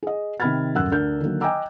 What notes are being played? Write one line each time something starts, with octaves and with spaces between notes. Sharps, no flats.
G#4 D#5
C3 D#3 B5 F6 G#6 A6
D#1 F#2 F#5 E6 F#6
D2 D4 A#4 F6 G6
D3 D#3 F#3 A#3
D#5 G5 G#5 A#5 D6 E6